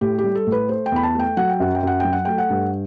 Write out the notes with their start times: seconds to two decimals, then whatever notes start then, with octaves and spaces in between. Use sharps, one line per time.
0.01 A2 G4
0.18 G4
0.24 G3
0.35 A4
0.47 A2
0.52 B4
0.69 A3 C5
0.86 G5
0.92 E2 B5
1.03 A5
1.15 A3 G5
1.37 F#3 F#5
1.50 G5
1.60 F#2 F#5
1.75 G5
1.83 F#2 F#5
2.00 F#3 G5
2.13 F#5
2.25 A3 G5
2.38 F#5
2.50 G2